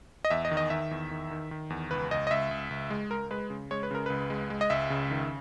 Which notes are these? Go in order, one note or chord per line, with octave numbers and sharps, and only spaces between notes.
D#5
E2 E5
D#5
D#3
D#5
D#3 E5
E2
D#3
D#3
D#3
E2
C#2 B4
C#2 D#5
D#5
C#2 E5
C#2
C#2
G#3
C#2 A#4
G#3 B4
C#3
G#3 C#5
B4
C#3 A#4
C#2 B4
G#3
G#3
D#5
C#2 E5
C#3
D#3